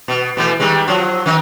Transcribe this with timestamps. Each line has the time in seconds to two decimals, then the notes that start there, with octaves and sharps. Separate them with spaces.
0.08 B2
0.37 B2 E3 A3
0.60 D#3 G3 G#3
0.87 F3 F#3
1.26 D#3 D#4